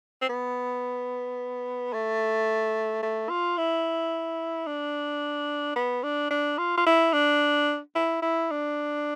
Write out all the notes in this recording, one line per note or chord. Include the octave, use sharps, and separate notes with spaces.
C4
B3
A3
A3
F4
E4
D4
B3
D4
D4
F4
F4
E4
D4
E4
E4
D4